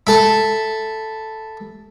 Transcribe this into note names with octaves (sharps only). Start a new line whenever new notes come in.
E4 A4 A5